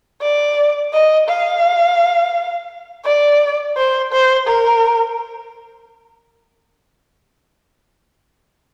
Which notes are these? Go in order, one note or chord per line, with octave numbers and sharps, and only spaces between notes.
D5
D#5
F5
D5
C5
C5
A#4